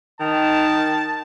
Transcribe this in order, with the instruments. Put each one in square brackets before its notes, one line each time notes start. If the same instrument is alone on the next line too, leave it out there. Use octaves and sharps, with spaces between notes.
[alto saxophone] D#3 [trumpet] A5